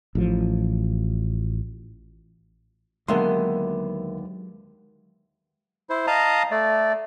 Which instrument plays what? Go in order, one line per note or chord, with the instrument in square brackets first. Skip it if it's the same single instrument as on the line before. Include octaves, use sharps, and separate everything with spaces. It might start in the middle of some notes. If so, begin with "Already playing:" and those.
[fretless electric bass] A1 A2 F3
[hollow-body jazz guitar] D#2 D3 B3 [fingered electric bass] F#3 G#3 [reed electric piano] A#4 E5 C6
[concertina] E4 C5
D#5 F5 A5 A#5 D#6
A3 D5